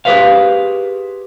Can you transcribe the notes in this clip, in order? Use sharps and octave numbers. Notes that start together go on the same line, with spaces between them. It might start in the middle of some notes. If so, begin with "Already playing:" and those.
G4 G#4 B4 C5 F5